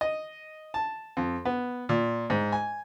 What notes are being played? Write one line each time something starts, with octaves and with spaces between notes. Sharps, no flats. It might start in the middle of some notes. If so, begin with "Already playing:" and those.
D#5
A5
F2
B3
A#2
G#2
G#5